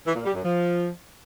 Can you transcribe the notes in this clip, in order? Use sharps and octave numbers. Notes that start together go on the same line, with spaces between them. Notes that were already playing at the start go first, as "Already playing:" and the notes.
E3
A#2
G3
F#2
F3